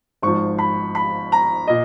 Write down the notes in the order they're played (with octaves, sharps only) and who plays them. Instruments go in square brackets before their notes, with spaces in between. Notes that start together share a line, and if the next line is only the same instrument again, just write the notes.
[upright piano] G#1 G#2 F3 C#6
B5
B5
A#5
A#2 D#5